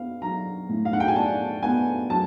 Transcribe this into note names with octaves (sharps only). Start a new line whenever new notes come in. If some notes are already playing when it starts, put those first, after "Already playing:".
Already playing: B3 F5
F#3 A#5
A2
F5
F#5
G5
G#5
D4 A5
B3 G#5
F#3 A5